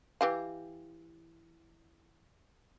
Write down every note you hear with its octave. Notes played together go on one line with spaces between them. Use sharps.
E3 G4 F5